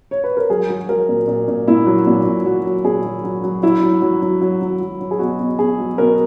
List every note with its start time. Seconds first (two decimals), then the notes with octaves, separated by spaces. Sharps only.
0.11 C#5
0.24 B4
0.37 A#4
0.50 F#3 G#4
0.69 F#3
0.89 F#3 A#4
1.09 A#2
1.28 A#2
1.48 A#2
1.68 A#2 E4
1.86 F#3
2.07 A#2 F#4
2.26 A#2
2.45 F#3 F#4
2.66 F#3
2.84 A#2 G#4
3.04 F#3
3.24 F#3
3.44 F#3
3.63 F#3 E4
3.83 F#3
4.02 F#3
4.22 F#3
4.41 F#3
4.61 F#3
4.81 F#3
5.01 F#3
5.11 G#4
5.19 B2 F#4
5.39 B2
5.59 B2 G#4
5.79 F#3
5.98 B2 A#4